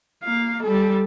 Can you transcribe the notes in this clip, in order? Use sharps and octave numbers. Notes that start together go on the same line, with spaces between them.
A#3 F5
G3 A4